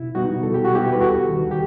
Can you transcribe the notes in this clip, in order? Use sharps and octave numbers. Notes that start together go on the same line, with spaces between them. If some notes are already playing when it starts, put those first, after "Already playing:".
Already playing: B2 E4
G3 B3 D#4 F#4
B2 A4
G4
F#4
G3 B3 E4 G4
B4
D#2 F#4 A4
D#3 G3
G4